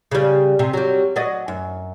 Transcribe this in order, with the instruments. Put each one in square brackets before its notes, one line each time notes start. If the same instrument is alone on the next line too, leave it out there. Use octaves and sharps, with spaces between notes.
[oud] C#3 G3
C3
F#3 G3
F#3 D5 D#5
F#2